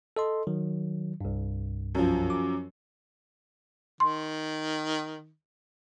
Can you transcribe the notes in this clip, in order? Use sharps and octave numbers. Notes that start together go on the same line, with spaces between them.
A4 D#5 C6
D#3 F#3
C2 G2
F#2 F3
D6
D#3 C6